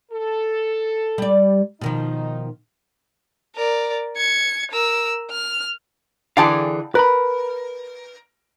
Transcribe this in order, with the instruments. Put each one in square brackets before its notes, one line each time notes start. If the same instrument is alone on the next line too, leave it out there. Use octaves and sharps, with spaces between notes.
[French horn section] A4
[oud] G3 D5
[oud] B2 D#3 F3 [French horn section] D#4
[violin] A#4 D5
G#6 C#7
A#4 E6
F6
[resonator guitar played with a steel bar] D3 E3 G#4 [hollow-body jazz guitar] F5 G5 A5
[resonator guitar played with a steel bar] A#4 [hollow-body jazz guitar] B4 B5